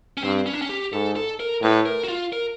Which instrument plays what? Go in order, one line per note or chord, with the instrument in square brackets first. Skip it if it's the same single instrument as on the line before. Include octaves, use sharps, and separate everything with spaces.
[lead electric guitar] C#4
[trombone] G2 [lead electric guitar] C4
[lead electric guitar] C#4
D4
C#4
G4
[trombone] G#2 [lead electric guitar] A4
[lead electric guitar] A4
A#4
[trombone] A2 [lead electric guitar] B4
[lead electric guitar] A#4
F#4
F4
A#4